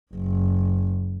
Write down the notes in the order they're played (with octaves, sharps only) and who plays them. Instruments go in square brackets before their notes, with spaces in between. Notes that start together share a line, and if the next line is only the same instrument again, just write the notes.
[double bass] F#1